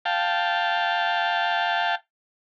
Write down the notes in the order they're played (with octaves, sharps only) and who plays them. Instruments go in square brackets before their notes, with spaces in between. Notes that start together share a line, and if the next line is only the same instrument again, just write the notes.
[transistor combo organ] F5 G5 A5